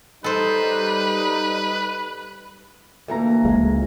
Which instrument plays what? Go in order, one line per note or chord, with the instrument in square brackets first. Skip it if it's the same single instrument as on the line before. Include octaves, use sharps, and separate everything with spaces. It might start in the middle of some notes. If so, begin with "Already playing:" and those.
[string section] G3 [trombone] D#4 [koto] A4 C5 [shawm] B4
[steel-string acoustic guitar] D2 E3 A#5 [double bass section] A#3
[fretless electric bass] C#2 F3 G#3